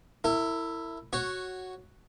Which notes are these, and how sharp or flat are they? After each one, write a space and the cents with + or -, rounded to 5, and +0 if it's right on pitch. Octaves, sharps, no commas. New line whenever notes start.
E4 +0 A#4 -45
F#4 +0 C#5 -10